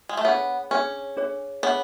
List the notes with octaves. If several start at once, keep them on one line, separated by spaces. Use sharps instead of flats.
G#3
A3
B3 D4 G#4 C#5
C#4 D4 G#4 C#5
D4 G#4 C#5
B3 D4 G#4 C#5